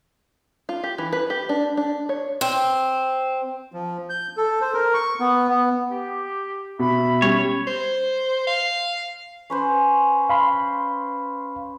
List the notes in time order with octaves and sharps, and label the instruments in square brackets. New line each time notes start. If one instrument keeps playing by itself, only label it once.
[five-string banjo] F4
G4
E3
B4
G4
D4
D4
C#5
[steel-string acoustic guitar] C4
[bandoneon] F3
G6
A4
C5
A#4
C#6
B3
B3
[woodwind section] G4
[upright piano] B2 [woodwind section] E5 B5
[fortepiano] G3 C#4 [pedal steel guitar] C#5
[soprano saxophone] C5
F5
[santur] C#4 B4 C5
[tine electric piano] F5 B5 C6